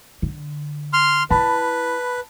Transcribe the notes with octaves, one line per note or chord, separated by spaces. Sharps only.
D3
C6 F6
E4 B4 A5 B5